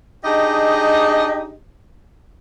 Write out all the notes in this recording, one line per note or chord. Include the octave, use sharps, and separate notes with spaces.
D4 D#4 G4 G#4 D#5